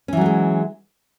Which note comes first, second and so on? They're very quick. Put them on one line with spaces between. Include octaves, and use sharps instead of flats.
C#4 E3 F#3 A3 G#3